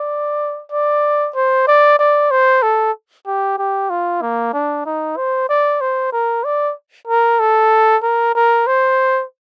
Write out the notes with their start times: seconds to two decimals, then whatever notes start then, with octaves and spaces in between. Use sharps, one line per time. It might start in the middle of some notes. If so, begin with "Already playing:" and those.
Already playing: D5
0.72 D5
1.35 C5
1.68 D5
1.99 D5
2.31 C5
2.63 A4
3.26 G4
3.58 G4
3.90 F4
4.22 A#3
4.53 D4
4.85 D#4
5.17 C5
5.49 D5
5.81 C5
6.12 A#4
6.44 D5
7.08 A#4
7.40 A4
8.03 A#4
8.35 A#4
8.67 C5